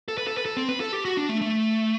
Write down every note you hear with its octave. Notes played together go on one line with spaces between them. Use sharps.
A4
B4
A4
B4
A4
C4
B4
A4
G4
F#4
D4
A3
A3